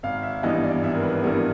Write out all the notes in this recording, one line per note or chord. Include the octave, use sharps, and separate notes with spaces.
G#1 F5
E5
G2 E3 G3 B3 D#5
D5
G#1 E5
A#4
B4
G2 E3 G3 B3 A#4